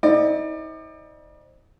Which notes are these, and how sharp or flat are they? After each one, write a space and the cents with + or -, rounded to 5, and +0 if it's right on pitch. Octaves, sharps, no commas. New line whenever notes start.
C4 +15 D#4 +45 D5 +35